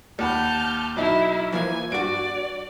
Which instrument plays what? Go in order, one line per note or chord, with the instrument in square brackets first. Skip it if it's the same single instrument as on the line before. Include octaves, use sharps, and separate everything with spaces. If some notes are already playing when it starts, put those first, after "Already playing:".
[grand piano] D#2 F#5 B5 [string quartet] A5 F6 G6
[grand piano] B1 D#4 [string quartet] E4
[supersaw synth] E3 F3 A#3 [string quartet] G#5
[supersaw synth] G2 F#4 [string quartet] D5 [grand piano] D7